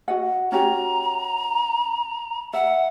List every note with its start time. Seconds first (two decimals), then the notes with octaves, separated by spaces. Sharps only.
0.08 F#4 D#5 F#5
0.52 C#4 F#4 G4 A#5
2.53 E5 F#5